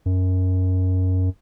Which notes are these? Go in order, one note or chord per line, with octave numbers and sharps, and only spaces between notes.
F#2